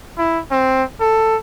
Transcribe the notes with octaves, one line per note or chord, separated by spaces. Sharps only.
E4
C4
A4